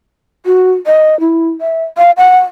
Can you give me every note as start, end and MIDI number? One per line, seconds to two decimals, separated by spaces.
0.46 0.72 66
0.86 1.18 75
1.20 1.48 64
1.61 1.84 76
1.98 2.11 77
2.17 2.38 78